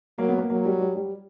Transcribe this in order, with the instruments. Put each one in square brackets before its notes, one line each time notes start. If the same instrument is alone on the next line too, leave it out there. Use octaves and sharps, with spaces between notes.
[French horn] F#3 [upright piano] A#3
[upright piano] B3
A#3
[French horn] F#3 [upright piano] A#3
[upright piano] G3
G3
G3